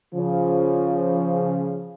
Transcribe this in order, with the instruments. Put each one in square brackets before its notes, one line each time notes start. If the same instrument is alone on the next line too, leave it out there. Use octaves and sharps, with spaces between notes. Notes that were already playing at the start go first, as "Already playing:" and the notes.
[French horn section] C#3 F3